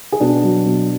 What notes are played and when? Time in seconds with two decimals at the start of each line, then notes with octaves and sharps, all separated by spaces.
0.12 G#4
0.20 B2 D4 F#4
0.44 F#3
0.66 B2